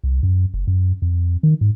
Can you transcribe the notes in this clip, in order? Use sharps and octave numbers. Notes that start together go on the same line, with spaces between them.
C2
F#2
F#1
F#2
F2
D#3
G#2